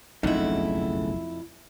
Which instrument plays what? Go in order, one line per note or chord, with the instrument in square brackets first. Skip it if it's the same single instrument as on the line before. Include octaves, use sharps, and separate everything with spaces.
[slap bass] F#1 B1 [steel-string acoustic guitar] F2 E4 [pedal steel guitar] C#3 A3 F#5 [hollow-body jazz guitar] D#4